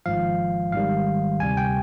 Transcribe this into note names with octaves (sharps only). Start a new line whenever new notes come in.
G#1 G#2 F3 F5
G#1 G#2 D#3 G3 F5
D2 C3 G3 G#5
G5